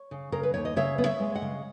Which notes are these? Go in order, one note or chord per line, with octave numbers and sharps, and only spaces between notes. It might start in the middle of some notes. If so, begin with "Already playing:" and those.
Already playing: C#5
C#3
C#3 A#4
B4
D#2 C#5
D#5
C#3 C#5 E5
B3
C#5 E5
G#3
D#5 F#5
C#3